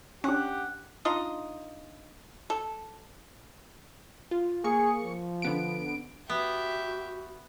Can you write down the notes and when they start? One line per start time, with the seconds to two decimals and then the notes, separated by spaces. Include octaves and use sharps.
0.24 C#4 D4 G4 F#5
1.05 D4 D#4 F4 D#5
2.50 A4
4.31 F4
4.64 A#3 G#4 C#6 C#7
5.03 F3
5.42 D3 B3 D7
6.29 B3 F#4 G4 E5